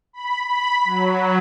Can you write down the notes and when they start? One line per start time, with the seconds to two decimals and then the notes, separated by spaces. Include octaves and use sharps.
0.13 B5
0.50 B5
0.85 F#3